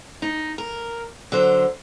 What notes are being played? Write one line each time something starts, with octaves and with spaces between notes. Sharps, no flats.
D#4
A#4
D3 F#3 C5